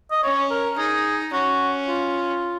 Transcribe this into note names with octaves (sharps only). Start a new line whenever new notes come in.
D#5
C#4 C#5
A#4
D#4 G#4
C#4 F#4
F4